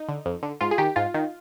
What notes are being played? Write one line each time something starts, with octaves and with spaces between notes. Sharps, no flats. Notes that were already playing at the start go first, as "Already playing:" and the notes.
Already playing: D#4
D3
F2
D3
G#2 F4
G#4
D#3 G4
G#2 F4
D#3